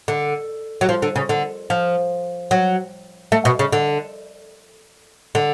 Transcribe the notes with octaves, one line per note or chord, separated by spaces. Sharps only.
D3
F#3
F3
D3
C#3
D3
F3
F#3
A3
B2
C#3
D3
D3